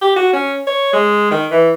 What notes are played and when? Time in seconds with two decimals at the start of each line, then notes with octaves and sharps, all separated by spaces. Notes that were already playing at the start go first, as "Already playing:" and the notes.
0.02 G4
0.16 F#4
0.33 C#4
0.67 C#5
0.93 G#3
1.31 D#3
1.51 E3